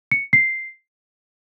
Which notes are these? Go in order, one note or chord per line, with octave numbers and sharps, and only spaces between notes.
C#7
C7